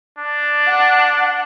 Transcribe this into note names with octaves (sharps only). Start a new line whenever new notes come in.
D4
F#5